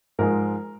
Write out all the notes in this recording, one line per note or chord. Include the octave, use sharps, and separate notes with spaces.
G#2 F3 G#3 A#4